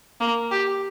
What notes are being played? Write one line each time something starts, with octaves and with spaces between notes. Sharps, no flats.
A#3
G4